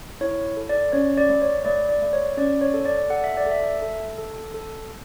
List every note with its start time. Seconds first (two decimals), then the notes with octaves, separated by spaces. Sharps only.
0.21 E4 C#5
0.57 A4
0.69 D5
0.93 C#4 C#5
1.18 D5
1.29 A3
1.42 C#5
1.65 A3 D5
1.89 D5
2.02 A3
2.13 C#5
2.37 C#4 D5
2.61 C#5
2.74 A4
2.85 D5
3.10 A4 F#5
3.24 E5
3.37 D5
3.46 A4 E5
3.82 A4
4.18 A4
4.54 A4